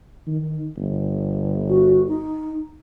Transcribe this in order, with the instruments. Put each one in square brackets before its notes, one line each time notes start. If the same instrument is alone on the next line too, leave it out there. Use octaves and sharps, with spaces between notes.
[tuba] D#3
G1
[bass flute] F#4
D#4